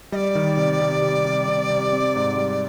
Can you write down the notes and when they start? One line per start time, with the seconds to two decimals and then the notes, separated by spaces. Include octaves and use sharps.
0.12 G3 D5 D#5
0.35 D#3
0.57 C3
0.81 C3
1.02 C3
1.25 C3
1.48 C3
1.70 C3
1.93 C4
2.15 G#2
2.38 G3